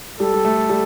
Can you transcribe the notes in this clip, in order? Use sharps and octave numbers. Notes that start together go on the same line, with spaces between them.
G3 A4
G3
A3
G3